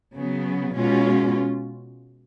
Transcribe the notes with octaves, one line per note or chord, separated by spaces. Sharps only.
C#3 F#3 B3
B2 G#3 C#4 F4